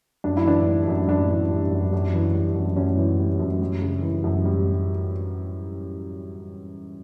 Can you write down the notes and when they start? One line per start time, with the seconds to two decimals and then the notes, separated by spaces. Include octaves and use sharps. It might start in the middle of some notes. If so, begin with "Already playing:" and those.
0.24 F#2 D4
0.37 E4
0.46 E3 D4
0.67 G3
0.88 F#2
1.09 F#2 D4
1.30 E3
1.51 G3
1.71 F#2
1.93 F#2
2.13 E3
2.34 G3
2.56 F#2
2.76 F#2 C#4
2.97 E3
3.19 G3
3.39 F#2
3.61 G3
3.82 C#3
4.02 E3
4.24 F#2
4.45 G3